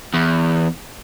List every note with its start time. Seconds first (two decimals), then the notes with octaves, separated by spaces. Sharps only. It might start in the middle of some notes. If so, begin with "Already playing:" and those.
0.14 E2